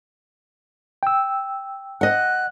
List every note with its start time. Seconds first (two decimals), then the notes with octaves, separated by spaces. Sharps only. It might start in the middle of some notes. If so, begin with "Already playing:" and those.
1.03 G5 E6
2.01 D#5 F#5 F#6